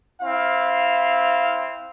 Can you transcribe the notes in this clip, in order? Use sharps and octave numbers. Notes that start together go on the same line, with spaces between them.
C4 E4 F5